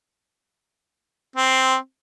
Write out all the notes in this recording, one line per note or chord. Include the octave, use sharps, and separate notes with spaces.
C4